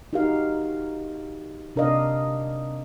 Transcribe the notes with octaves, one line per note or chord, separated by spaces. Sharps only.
D#4 F#4 G4 A#4 F5
C3 D4 A#4 D5 D#5 F5